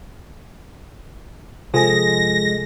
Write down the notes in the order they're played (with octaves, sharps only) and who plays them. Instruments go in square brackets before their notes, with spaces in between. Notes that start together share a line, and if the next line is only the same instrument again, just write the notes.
[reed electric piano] C3 A4 [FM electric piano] F3 G#4 [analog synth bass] G#3 [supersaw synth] A#6